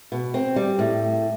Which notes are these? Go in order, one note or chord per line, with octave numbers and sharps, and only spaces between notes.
B2
C4
G3
A2